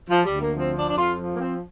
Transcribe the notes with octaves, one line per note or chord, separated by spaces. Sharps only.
F3
D2 G3
A#3
F3 C4
D4
F2 D4
F4
F3
A#3
C4